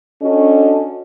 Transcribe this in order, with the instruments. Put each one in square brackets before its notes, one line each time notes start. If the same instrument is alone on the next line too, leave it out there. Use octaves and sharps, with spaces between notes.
[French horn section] C#4 D4 F#4 A4 D#5